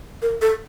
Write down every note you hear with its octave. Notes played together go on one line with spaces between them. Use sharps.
A#4
A4